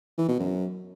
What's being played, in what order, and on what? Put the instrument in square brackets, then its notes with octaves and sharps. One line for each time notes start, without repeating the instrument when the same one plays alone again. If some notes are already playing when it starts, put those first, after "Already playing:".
[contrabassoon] E3
B2
F#2